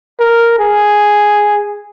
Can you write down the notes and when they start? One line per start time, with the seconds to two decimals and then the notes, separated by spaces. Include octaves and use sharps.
0.20 A#4
0.59 G#4